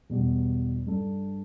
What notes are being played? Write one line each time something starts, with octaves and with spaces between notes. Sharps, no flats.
E2 B2 G3 B3 G4
G2 G3 D4 A4